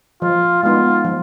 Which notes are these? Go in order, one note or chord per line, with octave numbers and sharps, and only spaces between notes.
F3 F4
G#3 B3 D#4 F4
F3